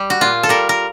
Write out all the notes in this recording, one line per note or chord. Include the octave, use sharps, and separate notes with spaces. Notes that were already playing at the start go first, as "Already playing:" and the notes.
Already playing: G3
F#4
A#2 F4
A4
G3 A#4
A#4